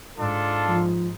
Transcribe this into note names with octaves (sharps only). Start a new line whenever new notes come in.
G#2 D4 F4 A4
F3